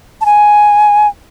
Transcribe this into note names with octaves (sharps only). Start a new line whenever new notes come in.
A5
G#5